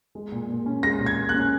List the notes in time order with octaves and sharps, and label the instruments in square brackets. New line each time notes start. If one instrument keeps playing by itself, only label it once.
[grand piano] G#3
A#2
A#2
C#4
G#3 A#6
A#2
G#6
A#2
F#6
C#4